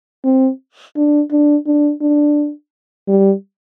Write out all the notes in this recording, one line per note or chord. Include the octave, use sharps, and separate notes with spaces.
C4
D4
D4
D4
D4
G3